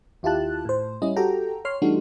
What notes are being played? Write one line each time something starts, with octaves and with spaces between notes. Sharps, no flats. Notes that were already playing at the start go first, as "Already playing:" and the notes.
D#2 E4 F4 G4 A5 F#6
A2 C5
G3 C#4 E4 D#5
F#4 G4 A4 G5 A#5
C#5 C6 F6 C7
E3 G3 A3 D4 D#4 F#4